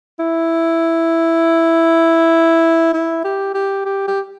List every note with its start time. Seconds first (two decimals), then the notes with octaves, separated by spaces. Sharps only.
0.20 E4
2.94 E4
3.25 G4
3.54 G4
3.85 G4
4.08 G4